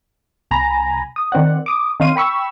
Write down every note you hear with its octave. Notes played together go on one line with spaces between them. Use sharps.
C2 G#5 A#5 B5
D#6
D#3 C4 D5 F#5
D6 D#6
D#3 C4 C#5 F5 C6 D#7
G5 B5 C#6 E6